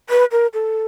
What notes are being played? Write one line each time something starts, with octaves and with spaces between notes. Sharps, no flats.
B4
A#4
A4